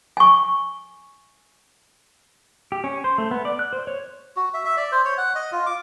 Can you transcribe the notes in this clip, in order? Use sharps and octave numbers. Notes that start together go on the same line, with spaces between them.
G#5 C#6
G4
C#4
C5
A3
B3
D5
F#6
C5
C#5
F#4
E5
E5
D5
C5
C#5
F#5
D#5
F4
D6